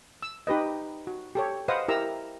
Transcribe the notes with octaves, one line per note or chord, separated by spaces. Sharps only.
E6
D#4 G4 B4 D#5
F#4
G4 A4 C#5
B4 C5 D#5 F5 F#5 D#6
E4 G4 A#4 A#5 E6